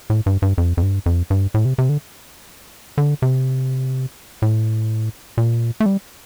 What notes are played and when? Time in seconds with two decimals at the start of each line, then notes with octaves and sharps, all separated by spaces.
0.10 A2
0.26 G2
0.42 G2
0.58 F2
0.77 F2
0.82 G2
1.06 F2
1.30 G2
1.54 A2
1.65 C3
1.78 C3
1.89 D3
2.98 D3
3.22 C3
4.42 A2
5.38 A#2
5.80 A3
5.86 G3